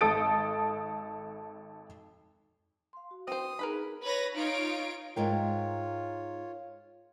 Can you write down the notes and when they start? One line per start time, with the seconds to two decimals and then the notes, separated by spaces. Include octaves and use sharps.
0.01 G#1 A4 D#6 A6 D7
2.93 F5 C6
3.11 F#4
3.28 C4 C5 D#6
3.59 D#4 G#4 A#4 B4 B5
4.03 B4 C#5 B5 A#6
4.35 D#4 F4 C#5 D7
5.16 G#2 F4 A#4 C#5 G5